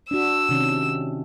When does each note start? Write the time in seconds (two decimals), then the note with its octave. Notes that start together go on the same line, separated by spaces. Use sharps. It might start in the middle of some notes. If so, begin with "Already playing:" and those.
0.11 D4 F#4 E6
0.49 C3 D#3 C#4